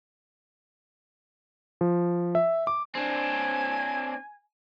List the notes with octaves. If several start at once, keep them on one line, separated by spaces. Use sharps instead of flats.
F3
E5
D6
C4 D4 G#5